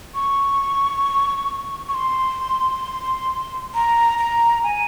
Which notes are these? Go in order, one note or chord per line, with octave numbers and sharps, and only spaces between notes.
C#6
C#6
C6
A#5
A#5
G#5